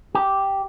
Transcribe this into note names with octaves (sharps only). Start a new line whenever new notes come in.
G4